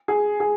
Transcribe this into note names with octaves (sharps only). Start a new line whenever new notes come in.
G#4
G#4